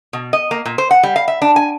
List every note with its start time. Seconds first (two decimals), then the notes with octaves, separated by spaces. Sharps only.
0.13 B2
0.33 D#5
0.51 A#3
0.66 A#2
0.78 C5
0.91 F#5
1.03 G3
1.16 F5
1.28 E5
1.42 D4
1.56 G#5